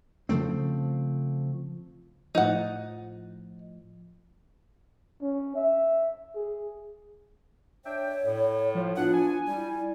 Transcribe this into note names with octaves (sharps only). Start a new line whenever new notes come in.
C#3 F3 A3 C4
A2 F3 D#4 F#5
C#4
E5
G#4
D4 C#5 E5 G5
A2
F3
E3 B3 D4 F4 F#5
G#5
G3 E4